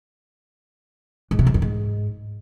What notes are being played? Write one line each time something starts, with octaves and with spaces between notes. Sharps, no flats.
G#2
C3
G#2
F#2
G#2